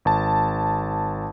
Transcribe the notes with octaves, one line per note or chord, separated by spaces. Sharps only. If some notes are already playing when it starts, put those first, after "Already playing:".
G#1 A5